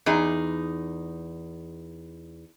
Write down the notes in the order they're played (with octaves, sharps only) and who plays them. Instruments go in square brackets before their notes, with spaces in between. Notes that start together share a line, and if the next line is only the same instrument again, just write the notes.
[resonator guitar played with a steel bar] E2 D#4 G#4